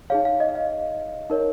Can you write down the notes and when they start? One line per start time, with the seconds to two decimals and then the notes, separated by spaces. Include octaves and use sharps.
0.10 D#4 G#4 C#5 F5
0.25 F5
0.40 D#5
0.55 F5
1.30 D#4 A#4 C#5